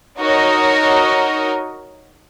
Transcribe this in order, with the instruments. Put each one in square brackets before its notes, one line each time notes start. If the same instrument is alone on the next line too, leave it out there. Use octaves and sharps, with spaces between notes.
[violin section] D#4 F#4 A#4 C#5 D#5